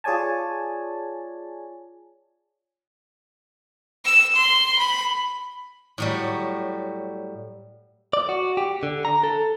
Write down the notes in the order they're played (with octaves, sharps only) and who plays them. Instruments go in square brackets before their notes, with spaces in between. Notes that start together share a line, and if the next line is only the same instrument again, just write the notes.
[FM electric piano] F4 G#4 C#5 D5 G#5 A5
[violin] E6
C6
B5
[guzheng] A2 F#3 G3
[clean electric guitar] D5
F#4
G4
D3
A#5
A4